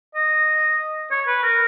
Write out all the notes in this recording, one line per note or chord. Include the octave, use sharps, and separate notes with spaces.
D#5
C#5
B4
A#4